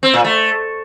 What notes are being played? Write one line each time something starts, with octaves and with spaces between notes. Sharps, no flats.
C4
A#2
A3